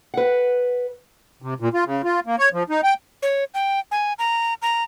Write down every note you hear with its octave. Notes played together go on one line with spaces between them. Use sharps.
B4 F#5
C3
A#2
F4
C#3
F4
A#3
C#5
F3
D#4
G5
C#5
G5
G#5
A#5
A#5